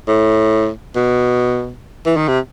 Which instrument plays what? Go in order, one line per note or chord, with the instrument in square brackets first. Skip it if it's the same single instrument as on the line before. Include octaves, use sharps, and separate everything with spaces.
[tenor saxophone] A2
B2
E3
D#3
C3